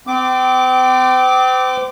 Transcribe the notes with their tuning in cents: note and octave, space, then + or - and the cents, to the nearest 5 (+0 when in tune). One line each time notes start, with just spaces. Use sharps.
C4 -35 D6 +0